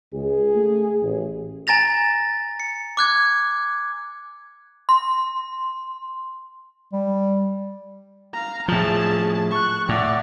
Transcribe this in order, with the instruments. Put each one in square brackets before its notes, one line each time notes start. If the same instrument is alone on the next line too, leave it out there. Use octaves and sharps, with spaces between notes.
[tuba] C#2 [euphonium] G#4
[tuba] A3
A1
[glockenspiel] G#5 A#5 A6 A#6 F7
C#7
D6 F#6 G#6
[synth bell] C6
[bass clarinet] G3
[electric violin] F5 A#5
[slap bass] A2 F3 [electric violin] G#4 A5
[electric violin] C#6 F#6
[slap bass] A2 [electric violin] D5 F#5